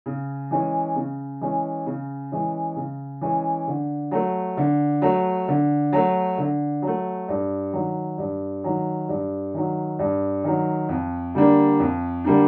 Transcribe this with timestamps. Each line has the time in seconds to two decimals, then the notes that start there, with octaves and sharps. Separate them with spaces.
0.06 C#3
0.51 E3 G#3 C#4
0.96 C#3
1.41 E3 G#3 C#4
1.86 C#3
2.32 E3 G#3 C#4
2.76 C#3
3.21 E3 G#3 C#4
3.67 D3
4.11 F#3 A3
4.57 D3
5.02 F#3 A3
5.48 D3
5.93 F#3 A3
6.38 D3
6.82 F#3 A3
7.29 G2
7.73 D#3 F#3
8.18 G2
8.64 D#3 F#3
9.09 G2
9.54 D#3 F#3
9.99 G2
10.44 D#3 F#3
10.89 F2
11.34 D3 G3 A#3 D4
11.80 F2
12.24 D3 G3 A#3 D4